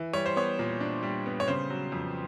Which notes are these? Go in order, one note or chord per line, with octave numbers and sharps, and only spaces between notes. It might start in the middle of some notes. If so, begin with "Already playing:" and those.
Already playing: E3
G3 C#5
C5
B3 C#5
A#2
D4
G3
B3
C#5
C#3 C5
F#3
F2